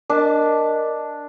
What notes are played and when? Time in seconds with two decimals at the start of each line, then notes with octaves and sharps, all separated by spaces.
0.10 D4 A#4 D#5